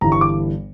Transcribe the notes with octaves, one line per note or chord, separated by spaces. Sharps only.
G1 G2 E3 A#5
C#6
D6